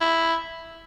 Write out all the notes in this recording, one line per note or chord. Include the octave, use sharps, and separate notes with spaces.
E4